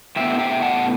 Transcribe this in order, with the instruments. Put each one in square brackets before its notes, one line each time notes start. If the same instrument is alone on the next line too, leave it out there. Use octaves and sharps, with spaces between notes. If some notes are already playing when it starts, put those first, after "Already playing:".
[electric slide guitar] A2 E3 B3 E5 G5
E5 G5
F#5 A5